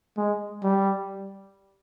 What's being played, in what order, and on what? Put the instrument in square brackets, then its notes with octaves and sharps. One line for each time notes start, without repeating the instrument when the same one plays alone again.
[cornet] G#3
G3